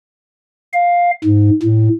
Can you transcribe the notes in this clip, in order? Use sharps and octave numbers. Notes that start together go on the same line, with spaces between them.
F5
G#2
A2